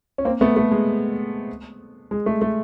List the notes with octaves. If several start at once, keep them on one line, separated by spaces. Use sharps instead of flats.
C#4
A#3 C4
A3 B3
A3
G#3
G#3
A3
A3